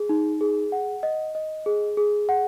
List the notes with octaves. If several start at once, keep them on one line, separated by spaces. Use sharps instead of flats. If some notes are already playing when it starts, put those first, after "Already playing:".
Already playing: G#4
D#4
G#4
F#5
D#5
D#5
G#4
G#4
F#5